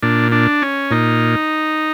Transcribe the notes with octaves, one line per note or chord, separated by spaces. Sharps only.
A#2 D4
D4
C#4
A#2 D#4